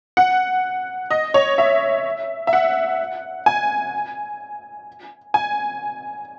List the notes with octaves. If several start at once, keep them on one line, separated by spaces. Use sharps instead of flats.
F#5
D#5
C#5
E5
E5
F#5
G#5
G#5